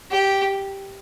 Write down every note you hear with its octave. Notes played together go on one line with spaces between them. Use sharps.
G4